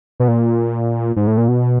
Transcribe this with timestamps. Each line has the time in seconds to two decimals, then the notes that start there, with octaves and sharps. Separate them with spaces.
0.20 B2
0.28 A#2
1.16 G#2
1.27 A2
1.38 A#2
1.48 B2